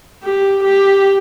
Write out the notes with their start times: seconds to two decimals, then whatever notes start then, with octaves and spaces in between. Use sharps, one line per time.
0.23 G4
0.64 G4